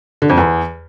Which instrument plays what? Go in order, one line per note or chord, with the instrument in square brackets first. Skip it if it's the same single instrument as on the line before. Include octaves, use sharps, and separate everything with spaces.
[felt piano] D3
F2
E2